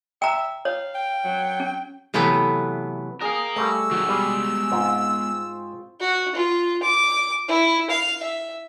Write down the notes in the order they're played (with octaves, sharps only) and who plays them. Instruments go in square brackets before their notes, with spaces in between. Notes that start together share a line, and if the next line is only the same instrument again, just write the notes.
[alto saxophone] E5 [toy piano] G5 A#5
[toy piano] C#5 [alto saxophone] F5
[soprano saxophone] G5
[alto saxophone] F#3
[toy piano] C#4
[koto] C3 E3 F#3 A3 B3
[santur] G#4 G5 D#6 [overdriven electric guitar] A#4 F5
[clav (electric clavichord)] G3 A3 [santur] G#5 B5 C#6 [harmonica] E6
[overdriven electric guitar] D#3 F#3 [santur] F#4
[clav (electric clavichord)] G3 [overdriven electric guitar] G#3 B3
[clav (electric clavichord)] G#2 [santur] C4 F4
[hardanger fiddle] F#4
F4
D6
E4
F5
E5